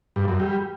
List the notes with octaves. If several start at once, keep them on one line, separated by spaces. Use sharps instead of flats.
G2
F#2
G3